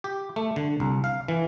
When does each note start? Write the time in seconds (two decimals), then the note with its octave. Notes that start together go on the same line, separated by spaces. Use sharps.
0.04 G4
0.36 A3
0.56 D3
0.80 C2
1.04 F5
1.28 E3